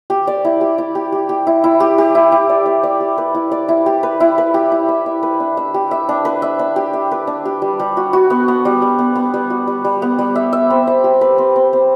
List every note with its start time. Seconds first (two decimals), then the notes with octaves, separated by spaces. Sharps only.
0.10 G4
0.27 D5
0.45 E4
0.61 G4
0.78 E4
0.95 G4
1.12 G4
1.29 G4
1.47 E4
1.64 E4
1.80 G4
1.98 G4
2.15 E4
2.32 E4
2.49 D5
2.66 D5
2.83 D5
3.00 G4
3.18 B4
3.34 E4
3.52 D5
3.69 E4
3.86 G4
4.03 B4
4.20 E4
4.38 B4
4.54 G4
4.72 E4
4.89 E5
5.06 E5
5.23 B4
5.40 D4
5.57 E5
5.74 G4
5.91 E5
6.09 D4
6.25 B4
6.42 E5
6.59 D4
6.76 G4
6.93 E5
7.11 B4
7.27 D4
7.45 G4
7.62 G3
7.79 G3
7.97 F#4
8.13 F#4
8.30 B3
8.48 B3
8.65 G3
8.82 G3
8.99 B3
9.15 B3
9.34 G3
9.50 F#4
9.67 G3
9.85 G3
10.02 B3
10.19 G3
10.35 E5
10.53 E5
10.70 C4
10.87 E5
11.04 G4
11.21 B4
11.38 C4
11.56 C4
11.73 C4